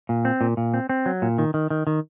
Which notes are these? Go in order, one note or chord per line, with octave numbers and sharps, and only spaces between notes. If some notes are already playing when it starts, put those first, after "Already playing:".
A#2
C4
A#2
A#2
C4
C4
F#3
A#2
D#3
D#3
D#3
D#3